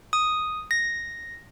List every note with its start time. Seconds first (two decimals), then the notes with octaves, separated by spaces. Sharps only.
0.13 D#6
0.71 A#6